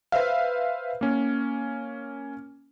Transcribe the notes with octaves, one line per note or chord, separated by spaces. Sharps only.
B4 C5 E5 F5
A#3 C#4